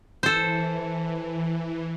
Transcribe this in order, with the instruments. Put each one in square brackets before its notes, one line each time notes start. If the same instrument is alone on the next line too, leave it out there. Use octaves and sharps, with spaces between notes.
[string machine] E3 [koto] A4 C5